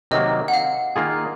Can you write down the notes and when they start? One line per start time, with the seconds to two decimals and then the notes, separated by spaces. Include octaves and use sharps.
0.11 C3 D#3 F#3 A#3 D#5
0.48 F#5
0.53 F5
0.96 D#3 A#3 F4 G#4